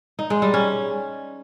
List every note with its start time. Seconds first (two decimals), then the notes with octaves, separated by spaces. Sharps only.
0.19 D#4
0.30 G#3
0.42 G3
0.54 C#4